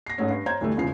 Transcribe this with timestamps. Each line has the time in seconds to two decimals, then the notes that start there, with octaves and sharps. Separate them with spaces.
0.07 A#6 C7
0.18 G#2 A3 C#4
0.30 G2
0.46 C5 C#5 F5 A#5 G6 G#6
0.61 D2 E3 G3 A3
0.77 E1 C#3 E3 F3 C7